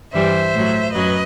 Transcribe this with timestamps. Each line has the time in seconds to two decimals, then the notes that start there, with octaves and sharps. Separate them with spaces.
0.13 G2 E3 G3 C5 E5
0.54 A2 F#3
0.93 F#2 F#3 B4 D#5